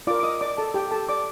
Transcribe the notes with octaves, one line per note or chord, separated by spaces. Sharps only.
F4 A#4 D5 D6
D6
D#5 D#6
D5 D6
A4 A5
G4 G5
A4 A5
D5 D6